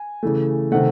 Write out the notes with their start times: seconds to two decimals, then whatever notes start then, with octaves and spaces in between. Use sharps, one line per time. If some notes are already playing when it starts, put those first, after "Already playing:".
Already playing: G#5
0.23 C#3 E3 A3
0.72 C3 D#3 A3 F#5